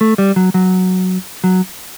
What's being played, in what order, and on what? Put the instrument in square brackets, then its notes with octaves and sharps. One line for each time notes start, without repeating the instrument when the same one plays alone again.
[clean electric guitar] A3
G3
F#3
F#3
F#3